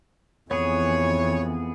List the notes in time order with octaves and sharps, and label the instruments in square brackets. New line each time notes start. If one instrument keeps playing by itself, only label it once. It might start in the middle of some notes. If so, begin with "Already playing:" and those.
[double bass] F2 E3 [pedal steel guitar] B3 G#4 [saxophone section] C#5